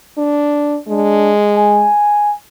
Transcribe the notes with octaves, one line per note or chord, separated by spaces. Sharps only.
D4
G#3 D4
G#5